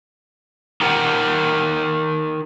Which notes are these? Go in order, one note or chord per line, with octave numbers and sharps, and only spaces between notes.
D#4 G4 A#4 F#5 G5